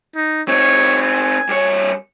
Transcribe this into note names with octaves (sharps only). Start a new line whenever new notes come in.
D#4
C4 D#4 C#5
G#5
G2 C#5